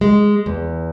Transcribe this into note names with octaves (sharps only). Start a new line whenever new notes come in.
G#3
E2